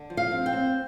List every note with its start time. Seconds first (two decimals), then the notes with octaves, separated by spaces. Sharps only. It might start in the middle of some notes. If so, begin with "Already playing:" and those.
Already playing: D3
0.10 F3
0.17 F5
0.31 C4
0.46 G5
0.53 C4